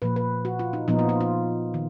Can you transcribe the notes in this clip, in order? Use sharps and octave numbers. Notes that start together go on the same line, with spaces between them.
A#2 F3 A#3 B4
B4
F#4
F4
D#4
A#2 F3 B3 D#4
F4
F4
F4
D#3